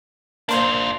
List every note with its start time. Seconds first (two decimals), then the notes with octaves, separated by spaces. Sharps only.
0.49 A#3 D4 F4 C5